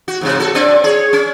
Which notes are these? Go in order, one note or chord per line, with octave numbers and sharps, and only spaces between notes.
F#4
E2 G#2 C3
F#4 A4
C4 D4 D5
G#4 C#5
C#4